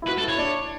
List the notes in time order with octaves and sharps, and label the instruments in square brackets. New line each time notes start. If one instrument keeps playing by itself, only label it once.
[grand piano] E4
[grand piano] F#4 [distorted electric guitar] B4
[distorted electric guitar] A4
[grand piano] E4
[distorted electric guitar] C#5
[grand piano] D4